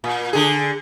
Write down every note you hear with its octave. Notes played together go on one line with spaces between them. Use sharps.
A#2
D3 G#4